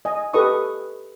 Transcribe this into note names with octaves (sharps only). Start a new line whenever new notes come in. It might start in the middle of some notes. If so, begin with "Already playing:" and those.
D#5 G#5
G4 A4 B4 D#5 C#6 D#6